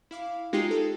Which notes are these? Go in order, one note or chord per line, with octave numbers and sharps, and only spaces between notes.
E4 F5 D6
G#3 D#4 F4 G4 G5 C7
A4